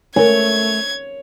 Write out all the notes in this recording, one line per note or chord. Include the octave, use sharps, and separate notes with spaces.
A3 A#4 C#5 G#5 G#6